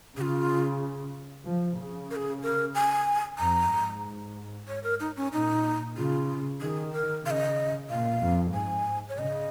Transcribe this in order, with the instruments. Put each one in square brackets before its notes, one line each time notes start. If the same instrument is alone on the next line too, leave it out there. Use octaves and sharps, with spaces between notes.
[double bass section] C#3 [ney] F4 G#4
[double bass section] F3
C#3
[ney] A#4
G#4
A#4
G#5
[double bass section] F2 [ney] A#5
[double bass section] G#2
[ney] C#5
A#4
D#4
C#4
[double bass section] A#2 [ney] D#4
[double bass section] C#3 [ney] F4
[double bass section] D#3 [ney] G#4
[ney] A#4
[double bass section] C#3 [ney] F5
[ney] D#5
[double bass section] A#2 [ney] F5
[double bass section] F2
[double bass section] G#2 [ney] G#5
[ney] C#5
[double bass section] C#3 [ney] D#5